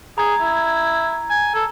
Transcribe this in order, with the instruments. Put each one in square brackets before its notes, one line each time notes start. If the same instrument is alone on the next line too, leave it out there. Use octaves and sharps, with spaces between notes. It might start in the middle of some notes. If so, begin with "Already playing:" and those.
[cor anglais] G#4 [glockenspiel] A#5 G#6
[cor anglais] E4
G#5
A4